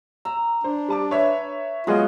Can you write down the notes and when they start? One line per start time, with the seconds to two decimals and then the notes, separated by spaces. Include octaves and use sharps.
0.25 A#5 E6
0.64 D4 C5
0.88 G3 A5 D6
1.11 B4 C#5 E5
1.87 F#3 G#3 B3 F4 F#4 G#4 C#5